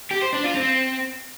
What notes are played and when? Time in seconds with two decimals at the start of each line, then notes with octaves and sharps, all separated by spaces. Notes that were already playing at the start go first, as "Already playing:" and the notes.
0.11 G4
0.23 C5
0.34 D4
0.46 F4
0.57 C4